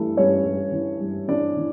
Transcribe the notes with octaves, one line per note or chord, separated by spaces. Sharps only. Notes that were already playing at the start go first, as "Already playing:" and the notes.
Already playing: G2 E3 A3 A4
G2 C#4 C#5
G2
E3
G2
E3 D4 D5
E3